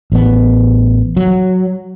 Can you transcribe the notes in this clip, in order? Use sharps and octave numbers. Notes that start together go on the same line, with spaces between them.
A1 B3
F#3